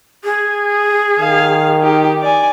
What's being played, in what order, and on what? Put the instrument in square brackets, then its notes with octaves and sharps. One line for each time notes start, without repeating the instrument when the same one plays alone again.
[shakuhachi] G#4
[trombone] D#3 [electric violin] F5
[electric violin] D#4 G4
D5 G#5